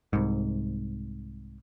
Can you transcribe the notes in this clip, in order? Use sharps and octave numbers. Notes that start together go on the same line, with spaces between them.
C2 G#2